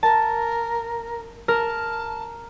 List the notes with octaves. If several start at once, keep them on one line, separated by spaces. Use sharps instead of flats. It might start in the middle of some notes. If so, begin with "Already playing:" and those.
A#4 A5
A#4 A5